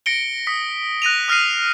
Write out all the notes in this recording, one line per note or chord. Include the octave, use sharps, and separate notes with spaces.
A#6 C#7 D7 G7
D#6 B6
F#6 A#6 D#7 F7
D#6 F6 A#6 C7 D#7